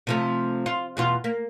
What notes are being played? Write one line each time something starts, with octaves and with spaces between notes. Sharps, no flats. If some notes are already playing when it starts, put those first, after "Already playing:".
C3 F3 A3
F4
E2 B2 F4
A#3